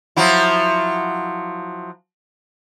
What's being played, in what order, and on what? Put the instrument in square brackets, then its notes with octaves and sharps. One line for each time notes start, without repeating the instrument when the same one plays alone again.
[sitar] F3 F#3 E4